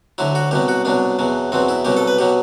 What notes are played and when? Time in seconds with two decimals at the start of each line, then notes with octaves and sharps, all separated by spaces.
0.18 D2 D3 F#3 E4
0.35 F#4
0.51 C2 B2 F#3 G4
0.68 F#4
0.85 C2 B2 F#3 D4
1.19 E2 B2 F#3
1.52 E2 B2 F#3 C4
1.68 E4
1.85 C2 B2 F#3 G4
1.97 A4
2.07 B4
2.18 B2 F#3 G4